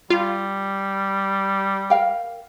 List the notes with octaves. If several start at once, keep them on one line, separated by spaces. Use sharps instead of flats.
G3 F4
A#4 F5 G5